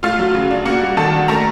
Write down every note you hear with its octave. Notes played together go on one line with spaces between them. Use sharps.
A3 F4 F5
F#3
C#3
D4
A#3 F#4 F#5
G3
D#3 A4 A5
D4
A3 A#4 A#5